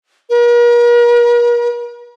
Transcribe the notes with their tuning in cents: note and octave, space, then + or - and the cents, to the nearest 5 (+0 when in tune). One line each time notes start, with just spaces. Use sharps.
A#4 +45